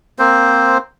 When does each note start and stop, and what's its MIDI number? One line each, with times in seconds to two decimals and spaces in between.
0.19 0.78 58
0.19 0.78 60
0.19 0.78 72